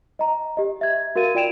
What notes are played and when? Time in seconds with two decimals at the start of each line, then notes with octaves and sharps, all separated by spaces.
0.19 D#5 A#5
0.57 G4 D#5
0.81 E5 G#6
1.16 F#4 A#4 F5 A6 D#7
1.35 F4 D5 G5 D7 E7 F7